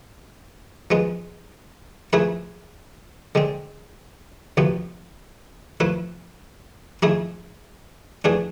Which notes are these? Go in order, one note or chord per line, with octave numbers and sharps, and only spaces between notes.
F3 G#3 B3
F3 A3 E4 G#4 B4
D3 G#3 C4
D2 C3 F3 B3
F3 A3 E4 B4
G#2 F3 A3 E4 G#4
F2 E3 A3 D4 G#4